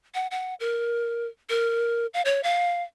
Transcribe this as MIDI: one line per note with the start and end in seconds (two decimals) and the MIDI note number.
0.15 0.27 78
0.31 0.54 78
0.60 1.27 70
1.50 2.06 70
2.14 2.22 77
2.25 2.41 73
2.43 2.83 77